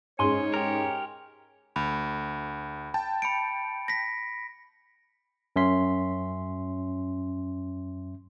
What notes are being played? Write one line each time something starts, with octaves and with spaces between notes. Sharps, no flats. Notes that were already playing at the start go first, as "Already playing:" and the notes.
G#2 C#4 G#4 C#5 G#5 C6
G4 A#4
D2 B5
G5 A5
B5 C#7 D7
A#6 B6
F#2 C#4 E5 C6 B6